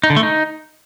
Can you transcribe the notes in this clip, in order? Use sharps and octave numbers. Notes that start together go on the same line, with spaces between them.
D#4
D3
A3
D#4